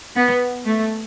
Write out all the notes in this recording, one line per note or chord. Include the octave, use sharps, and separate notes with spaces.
B3
A3